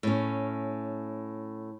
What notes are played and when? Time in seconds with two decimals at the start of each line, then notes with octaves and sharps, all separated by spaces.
0.03 A2 C#4